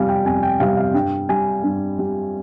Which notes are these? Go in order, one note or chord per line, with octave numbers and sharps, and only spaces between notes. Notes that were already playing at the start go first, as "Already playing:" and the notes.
Already playing: F2 C3 G3 F5 G#5
G5
F2 G#5
G5
C3 G3 F5
F5
G2 G5
G3 G#5
G2
G3